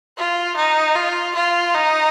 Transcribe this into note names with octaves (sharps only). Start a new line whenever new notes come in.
F4
D#4
F4
F4
D#4